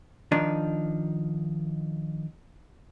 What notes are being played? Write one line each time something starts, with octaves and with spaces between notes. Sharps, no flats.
D#3 F3 D4 D#4